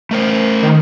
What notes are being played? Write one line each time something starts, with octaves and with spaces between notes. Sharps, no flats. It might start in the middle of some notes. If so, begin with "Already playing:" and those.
A3 A#4 C5
D#3